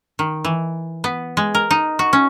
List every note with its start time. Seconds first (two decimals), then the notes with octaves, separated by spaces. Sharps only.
0.19 D#3
0.44 E3
1.04 B3
1.37 G#3
1.55 A#4
1.71 D#4
1.99 F#4
2.13 C#4